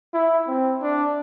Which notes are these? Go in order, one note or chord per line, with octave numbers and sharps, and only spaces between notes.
E4
C4
D4